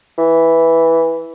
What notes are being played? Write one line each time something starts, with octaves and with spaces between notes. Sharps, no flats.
E3